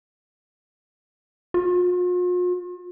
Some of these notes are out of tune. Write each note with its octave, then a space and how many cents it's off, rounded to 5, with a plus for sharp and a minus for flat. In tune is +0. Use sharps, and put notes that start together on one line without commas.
F4 +45